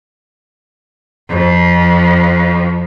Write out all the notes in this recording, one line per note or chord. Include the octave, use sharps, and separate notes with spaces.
F2 F3